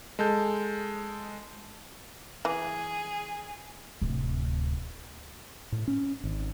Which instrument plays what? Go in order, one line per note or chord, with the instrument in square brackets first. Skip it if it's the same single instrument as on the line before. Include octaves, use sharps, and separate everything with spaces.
[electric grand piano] G#3 A4 A5 G6
[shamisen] E3 [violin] G#4
[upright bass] D1 C3
[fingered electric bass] A2
C#4
G#1